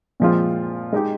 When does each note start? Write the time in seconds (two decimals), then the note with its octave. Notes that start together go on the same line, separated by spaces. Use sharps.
0.20 A#2 F3 G#3 C4 F4
0.92 G#3 D#4 G4